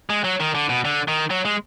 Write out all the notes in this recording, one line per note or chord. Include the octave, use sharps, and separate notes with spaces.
G#3
F#3
D#3
D3
B2
D3
D#3
F#3
G#3